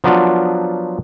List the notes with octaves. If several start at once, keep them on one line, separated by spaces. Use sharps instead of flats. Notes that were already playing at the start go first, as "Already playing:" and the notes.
F3 F#3 B3 D4 F4